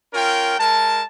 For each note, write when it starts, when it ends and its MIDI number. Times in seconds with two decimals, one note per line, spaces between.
0.14 0.56 61
0.14 0.56 65
0.14 0.56 70
0.14 0.56 79
0.59 1.02 56
0.59 1.02 70
0.59 1.02 81